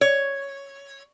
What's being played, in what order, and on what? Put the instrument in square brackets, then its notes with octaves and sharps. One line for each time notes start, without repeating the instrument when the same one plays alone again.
[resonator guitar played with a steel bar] C#5